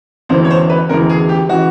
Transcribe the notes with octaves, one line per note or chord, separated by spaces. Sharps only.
E1 D2 C#3 E3 C5
C#5
C5
B4
E1 D2 C#3 E3 A#4
G#4
G4
C#3 E3 F#4